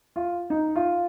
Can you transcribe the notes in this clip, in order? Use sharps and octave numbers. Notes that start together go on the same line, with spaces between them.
F4
D#4
F4